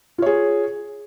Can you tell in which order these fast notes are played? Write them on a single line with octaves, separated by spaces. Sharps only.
F4 C#5 G#4